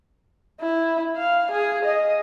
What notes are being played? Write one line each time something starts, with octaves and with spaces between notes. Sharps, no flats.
E4
F5
G#4
D#5